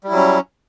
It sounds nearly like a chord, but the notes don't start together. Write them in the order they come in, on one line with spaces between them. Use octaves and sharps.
G3 E4 F#3 C#4